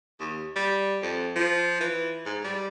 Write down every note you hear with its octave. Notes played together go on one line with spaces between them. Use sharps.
D#2
G3
F2
F3
E3
G#2
G3